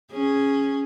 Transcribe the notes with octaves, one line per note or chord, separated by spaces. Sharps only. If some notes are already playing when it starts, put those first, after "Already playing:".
C#4 G#4